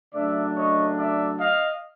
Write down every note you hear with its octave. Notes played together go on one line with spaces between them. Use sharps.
C#3 F#3 A3 D4 D5 E5
C#5 D#5
D5 E5
D#5 F5